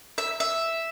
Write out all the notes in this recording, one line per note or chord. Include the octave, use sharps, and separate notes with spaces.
E5
E5